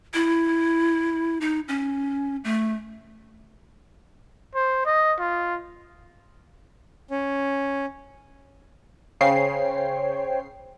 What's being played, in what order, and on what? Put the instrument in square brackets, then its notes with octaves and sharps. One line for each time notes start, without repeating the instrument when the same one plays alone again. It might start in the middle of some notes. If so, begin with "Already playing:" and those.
[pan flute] E4
D#4
C#4
A3
[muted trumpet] C5
D#5
F4
[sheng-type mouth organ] C#4
[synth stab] C#3 C7 [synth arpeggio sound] C5 C#5 G5